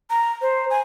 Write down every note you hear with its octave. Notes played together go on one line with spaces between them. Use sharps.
A#5
C5
G#5